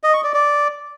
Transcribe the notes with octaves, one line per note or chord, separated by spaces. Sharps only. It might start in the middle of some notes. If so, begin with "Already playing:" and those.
D#5
C#6
D5
D5